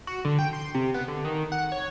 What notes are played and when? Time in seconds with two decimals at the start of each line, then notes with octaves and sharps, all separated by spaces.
0.07 F#4
0.25 D3
0.39 G5
0.53 C6
0.75 C3
0.94 B3
1.08 D3
1.25 D#3
1.52 F#5
1.72 C#5